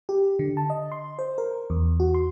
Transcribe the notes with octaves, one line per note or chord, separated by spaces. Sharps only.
G4
D3
A5
D#5
C6
C5
A#4
E2
F#4
C6